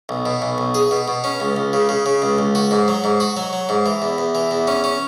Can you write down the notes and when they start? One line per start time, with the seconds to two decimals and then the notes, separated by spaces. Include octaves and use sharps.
0.09 B1
0.26 B2
0.42 B1
0.58 B1
0.74 G#4
0.91 B2
1.08 B2
1.24 C#4
1.40 C#2
1.56 C#2
1.73 C#3
1.89 C#3
2.06 C#3
2.22 C#2
2.38 C#2
2.55 F#4
2.71 G#2
2.88 F#3
3.04 G#2
3.20 F#4
3.37 F#3
3.53 F#3
3.69 G#2
3.86 E3
4.02 E2
4.18 E2
4.35 E3
4.51 E2
4.67 C#4
4.84 C#4